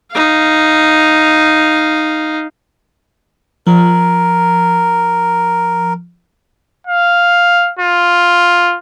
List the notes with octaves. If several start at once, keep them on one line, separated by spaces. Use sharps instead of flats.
D#4 F5
F3 A#4
F5
F4